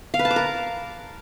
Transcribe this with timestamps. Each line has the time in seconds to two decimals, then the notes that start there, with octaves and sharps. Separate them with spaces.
0.14 F5
0.19 B4
0.25 A5
0.31 D6
0.36 A#4